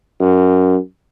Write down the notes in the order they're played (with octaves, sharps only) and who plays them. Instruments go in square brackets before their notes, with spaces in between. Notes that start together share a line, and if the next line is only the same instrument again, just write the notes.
[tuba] F#2